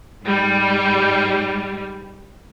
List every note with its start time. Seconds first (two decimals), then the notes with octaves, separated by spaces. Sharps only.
0.22 G#2 G3